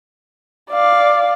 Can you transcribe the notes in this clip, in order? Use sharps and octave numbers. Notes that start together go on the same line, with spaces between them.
D5 F5